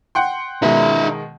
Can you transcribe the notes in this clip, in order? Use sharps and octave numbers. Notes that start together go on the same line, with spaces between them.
F#5 G5 C6
B2 D#3 G#3 D#4 E5